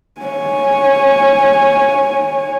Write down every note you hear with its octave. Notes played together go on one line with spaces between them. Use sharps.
C#5 G#5